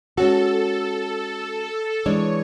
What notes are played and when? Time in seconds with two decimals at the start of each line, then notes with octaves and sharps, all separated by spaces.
0.17 G#3 C#4 F#4 A4
2.06 E3 G#3 D4 C#5